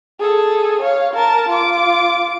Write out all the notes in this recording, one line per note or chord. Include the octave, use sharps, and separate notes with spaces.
G#4 A4
C#5 F5
A#4 A5
F4 D6